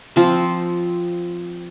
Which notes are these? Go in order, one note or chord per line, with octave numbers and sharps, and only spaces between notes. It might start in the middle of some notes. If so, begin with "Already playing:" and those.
F3 C4